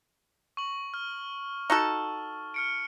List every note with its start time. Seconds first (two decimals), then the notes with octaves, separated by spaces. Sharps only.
0.57 C#6 F#7
0.94 F6
1.70 D#4 F#4 A4
2.54 F6 C#7 D7